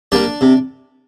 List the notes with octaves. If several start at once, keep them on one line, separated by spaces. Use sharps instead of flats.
G3 A#3 D4 D5
C3